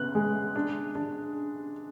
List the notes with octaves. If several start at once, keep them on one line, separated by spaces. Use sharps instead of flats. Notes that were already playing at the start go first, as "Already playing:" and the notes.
Already playing: C#3 B3 F#6
G#3
D4
D4